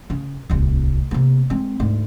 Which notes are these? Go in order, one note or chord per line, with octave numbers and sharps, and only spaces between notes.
C#3
D1 C2
C3 A#3
G#3 C4
D2 G#2